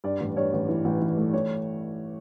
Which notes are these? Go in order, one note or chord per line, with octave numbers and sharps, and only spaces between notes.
G2 D5
A1
G2 C#5
A1
E3
A1
E3
A3
E3 C#5